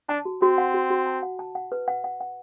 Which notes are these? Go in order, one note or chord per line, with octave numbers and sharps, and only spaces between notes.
D4 A5
F#4
C4 F#4
F#5
F#4
F#4
A5
F#5
A5
F#5
B4
F#5
F#5
F#5